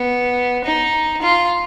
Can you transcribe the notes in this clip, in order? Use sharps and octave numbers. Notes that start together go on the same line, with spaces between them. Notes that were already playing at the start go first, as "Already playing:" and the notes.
Already playing: B3
D#4
F4